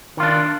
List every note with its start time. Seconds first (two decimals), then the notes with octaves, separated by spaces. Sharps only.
0.17 D#3
0.20 F4
0.23 D4